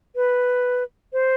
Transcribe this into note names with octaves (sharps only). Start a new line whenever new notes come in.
B4
C5